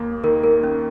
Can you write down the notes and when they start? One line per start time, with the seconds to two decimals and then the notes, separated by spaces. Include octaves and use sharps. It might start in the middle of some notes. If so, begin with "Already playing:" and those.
Already playing: D#2 A#3
0.24 D#3 A#4
0.44 A#4
0.53 A#3
0.63 C#4